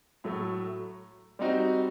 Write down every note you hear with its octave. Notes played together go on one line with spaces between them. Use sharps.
A2 F#3 A3
G3 C4 D#4 F#4